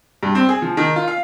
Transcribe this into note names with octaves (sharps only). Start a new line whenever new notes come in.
G2
C4
G#4
F3
D#3
F4
F5